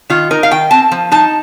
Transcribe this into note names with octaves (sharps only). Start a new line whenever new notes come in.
D#3 F4
D#4 A#4
F5
D#3 G5
C4 A5
F3
D#4 A5